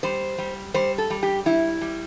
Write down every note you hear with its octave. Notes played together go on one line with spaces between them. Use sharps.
G3 C5
G3
G3 C5
A4
G3
G4
G3 E4
G3